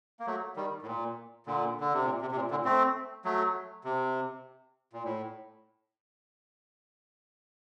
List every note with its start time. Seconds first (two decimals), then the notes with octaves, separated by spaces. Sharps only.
0.20 A#3
0.27 F#3 A3
0.56 D#3 G3
0.82 A2
0.86 A#2
1.46 A#2 D3
1.81 D3
1.94 C3
2.05 A#2
2.21 C3
2.32 C3
2.36 A#2
2.51 A#2 D3
2.65 A3 C4
3.25 F#3 A3
3.84 C3
4.93 A#2
5.04 A2